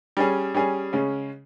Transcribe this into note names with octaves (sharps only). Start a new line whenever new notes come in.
G3 C#4 G#4
G3 C#4 G#4
C#3 G#3 C#4